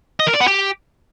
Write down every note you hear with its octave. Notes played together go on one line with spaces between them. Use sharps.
D#5
A#4
D5
B3
G4